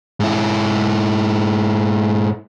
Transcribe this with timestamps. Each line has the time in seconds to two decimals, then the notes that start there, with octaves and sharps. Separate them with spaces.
0.20 G#2 E4